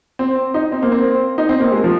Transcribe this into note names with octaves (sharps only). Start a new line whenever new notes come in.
C4
D#4
C4
A#3
C4
D#4
C4
A#3
G#3
F3